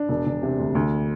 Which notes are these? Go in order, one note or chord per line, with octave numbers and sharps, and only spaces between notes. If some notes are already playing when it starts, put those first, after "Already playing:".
Already playing: D4
E1
E1
C3
D2
D2